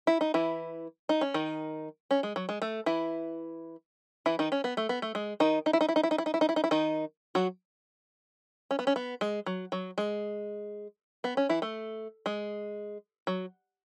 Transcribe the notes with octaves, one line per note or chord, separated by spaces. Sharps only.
E4
D#4
E3 E4
D#4
C#4
D#3 D#4
C#4
G#3
F#3
G#3
A3
E3 E4
E3 E4
D#3 D#4
C#4
B3
A3
B3
A3
G#3
D#3 D#4
D#4
E4
D#4
E4
D#4
E4
D#4
E4
D#4
E4
D#4
E4
D#4
E4
D#3 D#4
F#3 F#4
C#4
B3
C#4
B3
G#3
F#3
F#3
G#3
B3
C#4
E3 E4
A3
G#3
F#3